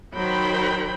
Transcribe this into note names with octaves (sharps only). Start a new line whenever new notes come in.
D#3 F#3 C5 G5 B5